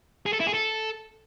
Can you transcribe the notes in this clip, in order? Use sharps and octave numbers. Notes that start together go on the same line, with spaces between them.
G#4
A4
E4
G#4
A4